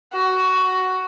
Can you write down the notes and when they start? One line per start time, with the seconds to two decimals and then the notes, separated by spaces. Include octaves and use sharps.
0.13 F#4